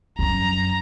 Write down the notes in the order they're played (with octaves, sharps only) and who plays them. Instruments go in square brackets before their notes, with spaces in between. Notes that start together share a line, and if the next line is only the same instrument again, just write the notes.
[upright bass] F#2 [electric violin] A#5